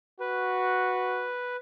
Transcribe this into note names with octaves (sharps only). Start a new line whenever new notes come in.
F#4 B4